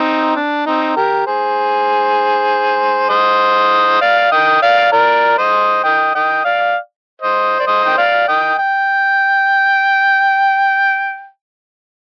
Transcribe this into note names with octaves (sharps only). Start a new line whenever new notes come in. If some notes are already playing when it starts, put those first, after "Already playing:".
Already playing: C4 D#4
D4
C4 D#4
G4 A#4
G#4 C5
C5 D#5
D5 F5
D#5 G5
D5 F5
A#4 D5
C5 D#5
D#5 G5
D#5 G5
D5 F5
C5 D#5
D5
C5 D#5
G5
D5 F5
D#5 G5
G5